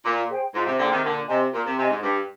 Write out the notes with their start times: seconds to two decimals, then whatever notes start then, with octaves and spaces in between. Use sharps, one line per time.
0.05 A#2 F4
0.29 G#4 C5 G5
0.54 G#2 F4
0.66 C3
0.79 A#2 D3 G#4 C5 G5
0.91 C3 D#3
1.04 A#2 D3 A#4
1.28 C3 D#5 G#5 C6
1.53 A#2 A#4
1.65 C3
1.78 C3 D#5 G#5 C6
1.90 G#2
2.02 G2 G4